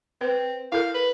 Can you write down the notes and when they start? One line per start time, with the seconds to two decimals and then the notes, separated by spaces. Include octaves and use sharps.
0.21 C4 B4
0.72 E4 A4 A#4 F5
0.94 B4